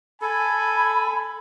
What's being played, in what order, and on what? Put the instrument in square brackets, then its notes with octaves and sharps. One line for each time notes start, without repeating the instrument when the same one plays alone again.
[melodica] A4 [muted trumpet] G#5 [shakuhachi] B5